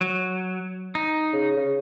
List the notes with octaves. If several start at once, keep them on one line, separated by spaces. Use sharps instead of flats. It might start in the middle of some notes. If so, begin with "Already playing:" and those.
F#3
D#4
C#3
C#3